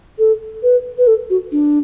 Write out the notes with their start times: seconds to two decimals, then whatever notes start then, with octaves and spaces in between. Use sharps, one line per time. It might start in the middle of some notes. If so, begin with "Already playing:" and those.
0.18 A4
0.63 B4
0.98 B4
1.07 A4
1.30 F#4
1.51 D4